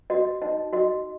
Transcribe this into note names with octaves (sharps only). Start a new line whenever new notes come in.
F#4 D#5
D#4 D#5
F#4 D#5